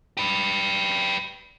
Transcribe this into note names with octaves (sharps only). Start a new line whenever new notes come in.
G4 B4